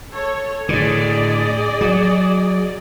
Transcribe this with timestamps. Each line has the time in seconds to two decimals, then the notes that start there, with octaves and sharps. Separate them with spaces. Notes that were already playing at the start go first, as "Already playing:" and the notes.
0.12 A4 C#5
0.69 A2 D3 G#4 D5 D#5
1.81 F#3